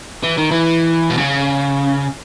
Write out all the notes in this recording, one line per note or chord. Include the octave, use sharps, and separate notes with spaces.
E3
D#3
E3
B2
C#3